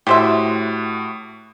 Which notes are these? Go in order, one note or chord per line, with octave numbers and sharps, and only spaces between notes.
A2 F#4 G4 C5 E5 D6